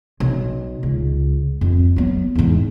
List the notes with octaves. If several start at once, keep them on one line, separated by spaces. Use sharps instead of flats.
B1
C#2
F2
F#3 B3
E2 G#2